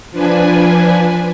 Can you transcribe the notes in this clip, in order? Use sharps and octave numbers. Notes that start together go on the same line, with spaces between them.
F3 D4 B4 G#5